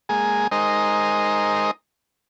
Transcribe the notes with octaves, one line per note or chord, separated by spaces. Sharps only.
G#3 A#3 G#4
G#3 D#4 A#4 C5 D#5